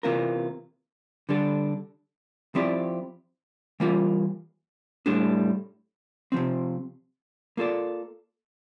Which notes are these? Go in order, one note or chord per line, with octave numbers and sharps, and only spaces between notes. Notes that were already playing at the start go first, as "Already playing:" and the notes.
C3 E3 A#3 F4 A#4
D3 G3 D4 A4
F3 C4 E4 G4 D5
E3 G3 A#3 F4
A2 G3 D4 A4
C3 F3 C4
A#3 F4 A4 D5